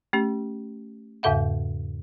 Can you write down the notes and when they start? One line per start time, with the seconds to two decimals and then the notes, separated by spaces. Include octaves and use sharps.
0.13 A3 C#4 G4
1.23 E2 G#2 C#3 A4 E5 F#5